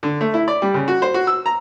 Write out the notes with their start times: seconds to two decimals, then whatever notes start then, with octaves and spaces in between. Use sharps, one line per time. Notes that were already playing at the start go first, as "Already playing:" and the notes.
0.03 D3
0.21 A3
0.34 E4
0.48 D5
0.62 G3
0.74 C#3
0.88 F#4
1.02 C5
1.14 F#4
1.27 E6
1.46 A#5